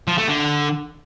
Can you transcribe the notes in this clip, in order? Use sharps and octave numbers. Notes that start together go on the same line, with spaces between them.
F3
A3
D3